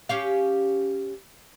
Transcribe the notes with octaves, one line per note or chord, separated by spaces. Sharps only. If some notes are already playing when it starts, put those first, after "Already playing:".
C#4 G4 F5